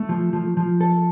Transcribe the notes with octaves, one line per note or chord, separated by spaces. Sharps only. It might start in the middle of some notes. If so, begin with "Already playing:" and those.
Already playing: A3
F3
F3
F3
A4